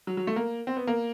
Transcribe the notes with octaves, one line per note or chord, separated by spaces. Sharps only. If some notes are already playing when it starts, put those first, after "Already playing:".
F#3
F#3
A3
A#3
C4
B3
A#3